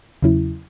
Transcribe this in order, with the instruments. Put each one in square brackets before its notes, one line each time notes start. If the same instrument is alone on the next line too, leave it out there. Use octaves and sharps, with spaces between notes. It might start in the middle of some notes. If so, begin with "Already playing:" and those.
[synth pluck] E2 C#3 F#3 C#4 E4